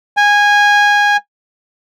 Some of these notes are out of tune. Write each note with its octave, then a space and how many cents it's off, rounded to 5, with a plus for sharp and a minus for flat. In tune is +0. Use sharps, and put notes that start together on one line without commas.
G#5 -15